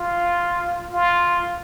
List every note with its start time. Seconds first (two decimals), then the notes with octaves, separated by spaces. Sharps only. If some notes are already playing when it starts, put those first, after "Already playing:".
Already playing: F4
0.92 F4